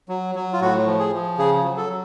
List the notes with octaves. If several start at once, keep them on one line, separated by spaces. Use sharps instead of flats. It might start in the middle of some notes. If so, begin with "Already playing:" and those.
F#3
F#3
F4
A2 F#4
F3
G#4
F3
C#3 G#4
F#3
A4
F#3